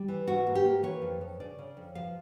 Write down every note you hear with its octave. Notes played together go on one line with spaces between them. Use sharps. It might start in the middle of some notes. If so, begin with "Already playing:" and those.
Already playing: G3
E3
G#2 F#4
A#3
G4
A#3
E3 C#5
F2
F2
C#3 D5
C#3
F2
F3 F5